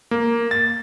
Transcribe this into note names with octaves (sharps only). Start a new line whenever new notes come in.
A#3
A6